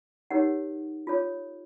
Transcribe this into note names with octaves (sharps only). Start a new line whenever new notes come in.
D#4 G4 A#4 C#5 F#5
F4 A4 C#5